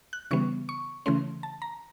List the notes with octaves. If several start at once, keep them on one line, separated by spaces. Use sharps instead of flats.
F#6
C#3 E3 G3 B3 C#6
C#6
C#3 E3 A3 C#4 C6
A5
A#5